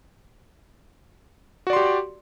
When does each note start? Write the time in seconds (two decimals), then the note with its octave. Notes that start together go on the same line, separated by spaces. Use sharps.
1.67 F#4
1.70 D5
1.73 C6
1.76 G4